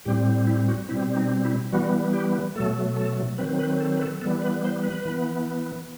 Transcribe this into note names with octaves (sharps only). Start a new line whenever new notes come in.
A2 G3 C4 G4
E4
F#4
B2 G3 C4 E4
D#4
E4
E3 G3 B3 F#4
G4
B2 F#3 A3 A4
A4
D#3 F#3 C4 B4
B4
A4
B4
A4
E3 G3 B3 A4
B4
C5
B4
E3 B3